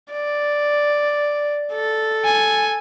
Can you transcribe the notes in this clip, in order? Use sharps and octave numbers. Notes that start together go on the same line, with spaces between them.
D5
A4
G#5